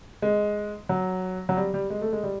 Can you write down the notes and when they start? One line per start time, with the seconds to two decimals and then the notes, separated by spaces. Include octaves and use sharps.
0.22 G#3
0.89 F#3
1.49 F#3
1.57 G3
1.74 G3
1.90 G#3
2.01 A3
2.13 G#3
2.23 G3